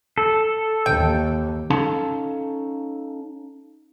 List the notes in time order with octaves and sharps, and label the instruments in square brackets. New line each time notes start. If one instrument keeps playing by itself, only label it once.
[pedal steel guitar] A4
[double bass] D#2 [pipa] G5
[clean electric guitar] C#4 D#4 A4 F5 A5